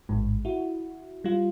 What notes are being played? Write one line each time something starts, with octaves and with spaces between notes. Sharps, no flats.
A1 G#2
E4 F#4
G3 F4